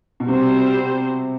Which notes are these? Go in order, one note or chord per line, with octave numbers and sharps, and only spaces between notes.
B2
C3 G3 C4 F#4 C5